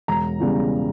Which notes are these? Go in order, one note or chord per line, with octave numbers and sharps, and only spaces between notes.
E1 A#5
E2 C#3 G3